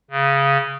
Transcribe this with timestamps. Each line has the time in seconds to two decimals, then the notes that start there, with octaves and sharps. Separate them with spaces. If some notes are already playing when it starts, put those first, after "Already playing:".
0.11 C#3